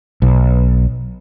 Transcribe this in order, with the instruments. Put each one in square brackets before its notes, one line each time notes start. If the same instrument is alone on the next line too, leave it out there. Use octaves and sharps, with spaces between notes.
[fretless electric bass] B1